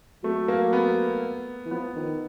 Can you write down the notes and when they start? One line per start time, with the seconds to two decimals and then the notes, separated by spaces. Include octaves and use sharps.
0.24 F#3 A3
0.48 A#3
0.73 B3
1.65 E3
1.71 F3 B3
1.96 D#3